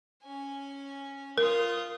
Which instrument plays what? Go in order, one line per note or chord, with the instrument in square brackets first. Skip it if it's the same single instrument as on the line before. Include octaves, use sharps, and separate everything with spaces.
[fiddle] C#4 G#5
[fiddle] F4 D#6 [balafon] A#4